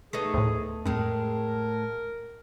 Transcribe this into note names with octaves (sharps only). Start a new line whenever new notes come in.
A3 B3 D#4 G#4 A#6
D2 A2
F2 A2 G#3 A#4